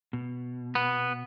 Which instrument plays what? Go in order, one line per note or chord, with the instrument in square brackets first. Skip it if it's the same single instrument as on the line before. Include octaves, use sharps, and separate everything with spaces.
[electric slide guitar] B2
[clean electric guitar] B3